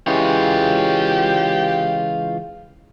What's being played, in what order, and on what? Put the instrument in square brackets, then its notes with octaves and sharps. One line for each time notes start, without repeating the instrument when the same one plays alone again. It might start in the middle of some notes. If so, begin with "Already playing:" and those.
[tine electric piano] C#3 E3 G#3 [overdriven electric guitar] F4 C#5 [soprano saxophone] G4